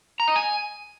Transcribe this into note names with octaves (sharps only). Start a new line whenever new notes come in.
A#5
D#5
G#5